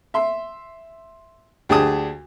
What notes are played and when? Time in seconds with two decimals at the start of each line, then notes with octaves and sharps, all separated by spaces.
0.14 E5 C6
1.69 D2 D4 G4 G#4 A5 D#6